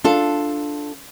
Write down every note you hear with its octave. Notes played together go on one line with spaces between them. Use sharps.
D4 F4 A4